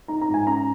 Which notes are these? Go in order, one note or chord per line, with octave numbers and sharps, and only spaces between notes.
D#4 A#5
A#5
G#2
G#5
C#4 A#5